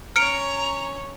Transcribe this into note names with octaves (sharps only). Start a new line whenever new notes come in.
C#4 C#5 A#5 F6 C#7 D7